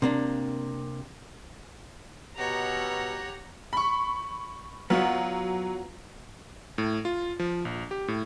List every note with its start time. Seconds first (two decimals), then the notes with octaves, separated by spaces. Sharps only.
0.02 C3 A#3 D4
2.38 B2 G4 C#5 F#5 A#5
3.73 B5 C#6
4.90 F#3 B3 F4 F#4
6.78 A2
7.05 F4
7.39 F3
7.65 A#1
7.91 G4
8.08 A2